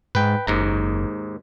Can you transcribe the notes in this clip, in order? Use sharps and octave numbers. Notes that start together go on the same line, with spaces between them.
G#2 B4 G5
F#1 D#2 G#2 A#5